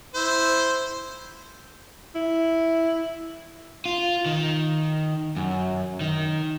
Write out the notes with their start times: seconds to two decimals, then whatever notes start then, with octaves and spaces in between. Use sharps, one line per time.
0.14 E4 C5
2.15 E4
3.86 F4
4.26 D#3
5.36 F#2
6.01 D#3